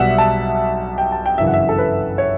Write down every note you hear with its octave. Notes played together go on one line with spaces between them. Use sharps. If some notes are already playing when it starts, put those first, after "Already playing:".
Already playing: B1 B2 G3 E5 F#5
A5
G5
A5
G5
G1 F#2 C#3 E3 E5
F#5
E5
A4
B4
C#5